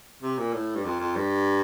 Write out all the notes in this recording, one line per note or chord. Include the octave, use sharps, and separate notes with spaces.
C3
A#2
A2
G2
F2
F2
G2